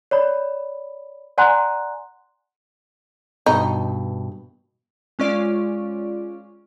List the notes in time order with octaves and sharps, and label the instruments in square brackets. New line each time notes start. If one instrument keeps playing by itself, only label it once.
[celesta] C#5 D5 B5
D5 F#5 G#5 A#5 C6 F#6
[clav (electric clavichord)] G2 B2 [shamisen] D#4
[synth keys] G#3 C#4 F4 D5